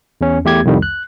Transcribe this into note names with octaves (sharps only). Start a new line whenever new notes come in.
E2 C#4
E2 A3 G4 G#6
C2 F2 D#3 G3
F#6